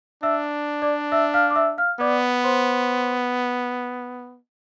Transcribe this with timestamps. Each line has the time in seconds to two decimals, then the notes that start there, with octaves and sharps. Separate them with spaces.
0.23 D4 E5 E6
0.82 D5 D6
1.12 E5 E6
1.34 F5 F6
1.50 D6
1.55 E5 E6
1.78 F5 F6
2.00 B3 D5 D6
2.44 C5 C6